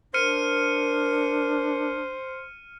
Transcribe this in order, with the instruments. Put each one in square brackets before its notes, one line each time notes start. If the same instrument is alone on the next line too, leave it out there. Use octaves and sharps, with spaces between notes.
[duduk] D4 [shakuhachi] A#4 [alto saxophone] C5 [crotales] F6 C#7 D#7